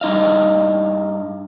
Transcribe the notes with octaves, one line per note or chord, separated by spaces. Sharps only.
G2 D#4 D#5 F5